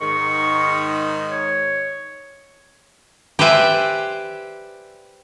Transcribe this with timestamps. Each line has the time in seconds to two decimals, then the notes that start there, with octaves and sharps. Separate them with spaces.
0.01 G#2 D#3 C#6
1.30 C#5
3.39 G4 B4 C5 D5 E5 G#5